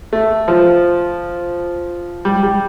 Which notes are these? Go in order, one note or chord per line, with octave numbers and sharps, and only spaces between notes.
A3
F3
G3
G3